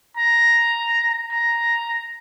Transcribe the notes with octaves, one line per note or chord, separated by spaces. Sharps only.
A#5
A#5